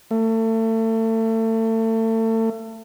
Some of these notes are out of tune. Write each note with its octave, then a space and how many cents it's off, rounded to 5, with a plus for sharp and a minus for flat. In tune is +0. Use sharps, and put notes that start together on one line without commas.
A3 +30